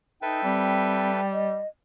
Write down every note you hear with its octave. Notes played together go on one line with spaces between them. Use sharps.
D#4 A4 B4 E5 G5
G3 C4
D#5